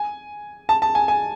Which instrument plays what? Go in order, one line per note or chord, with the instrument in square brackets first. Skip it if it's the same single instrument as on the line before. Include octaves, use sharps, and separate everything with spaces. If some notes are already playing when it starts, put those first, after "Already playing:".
Already playing: [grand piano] G#5
A5
A5
G#5
G#5